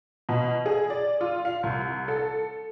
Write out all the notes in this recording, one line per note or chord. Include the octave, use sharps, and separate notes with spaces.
B2
G#4
D5
F4
F5
C2
A4